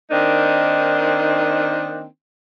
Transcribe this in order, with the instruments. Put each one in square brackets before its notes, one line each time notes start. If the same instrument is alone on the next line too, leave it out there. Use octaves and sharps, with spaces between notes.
[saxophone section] D#3 A#3 C4 D4 D#4